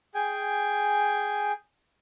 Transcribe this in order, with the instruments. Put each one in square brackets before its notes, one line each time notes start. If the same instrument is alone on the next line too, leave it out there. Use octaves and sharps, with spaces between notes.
[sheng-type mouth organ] G#4 G5 G#5